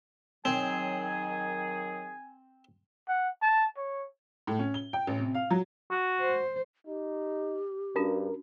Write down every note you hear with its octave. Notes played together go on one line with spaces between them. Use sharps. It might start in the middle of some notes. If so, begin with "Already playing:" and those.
D#3 F#3 C4 G#4 G#5
F#5
A5
C#5
A2
C#4
G7
G5
A1
C3
F5
F#3
F#4
C5
D#4 G4
G2 C#4 D4 F#4 A#4